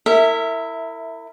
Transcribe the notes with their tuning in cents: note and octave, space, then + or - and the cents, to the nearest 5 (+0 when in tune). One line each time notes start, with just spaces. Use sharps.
E4 +0 A#4 -40 E5 -10